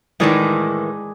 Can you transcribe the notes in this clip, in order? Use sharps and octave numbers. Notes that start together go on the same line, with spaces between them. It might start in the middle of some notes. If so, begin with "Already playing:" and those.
A2 D#3 E3 G#3 G#4 D5